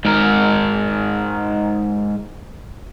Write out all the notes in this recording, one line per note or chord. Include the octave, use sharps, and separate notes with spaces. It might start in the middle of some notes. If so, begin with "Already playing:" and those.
G#2 A#4